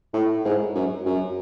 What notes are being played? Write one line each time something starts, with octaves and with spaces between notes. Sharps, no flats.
A2
G#2
F#2
F#2